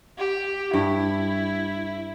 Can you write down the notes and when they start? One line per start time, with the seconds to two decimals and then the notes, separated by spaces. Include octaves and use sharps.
0.18 G4
0.74 G2 E4